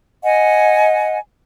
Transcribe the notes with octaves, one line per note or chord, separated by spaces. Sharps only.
D#5 F#5 G#5